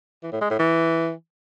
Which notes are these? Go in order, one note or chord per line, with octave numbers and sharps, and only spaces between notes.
E3
A2
G#3
A2
E3